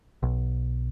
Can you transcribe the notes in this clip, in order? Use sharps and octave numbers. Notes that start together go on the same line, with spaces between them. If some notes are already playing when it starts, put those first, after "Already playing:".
B1